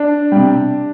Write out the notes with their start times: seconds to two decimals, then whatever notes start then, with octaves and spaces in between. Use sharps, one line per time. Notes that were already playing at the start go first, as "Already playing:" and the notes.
Already playing: D4
0.32 C3 G3